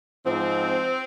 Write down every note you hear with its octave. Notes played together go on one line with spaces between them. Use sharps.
G#2 F3 C4